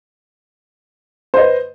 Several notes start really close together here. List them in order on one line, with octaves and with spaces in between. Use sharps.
C5 D#5 B4